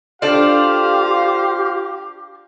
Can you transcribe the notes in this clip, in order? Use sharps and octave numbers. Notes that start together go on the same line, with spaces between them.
D4 F4 G4 A4 C5 D5 F5